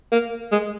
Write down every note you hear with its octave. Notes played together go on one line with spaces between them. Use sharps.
A#3
G#3